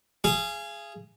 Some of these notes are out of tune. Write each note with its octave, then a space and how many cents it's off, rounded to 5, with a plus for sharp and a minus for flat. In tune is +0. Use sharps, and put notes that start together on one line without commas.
G#4 +0 F5 -35